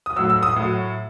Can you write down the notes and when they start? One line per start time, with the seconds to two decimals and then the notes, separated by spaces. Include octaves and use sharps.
0.06 D#6
0.16 A2 F#3 E6
0.30 E6
0.43 D#6
0.56 A2 F#3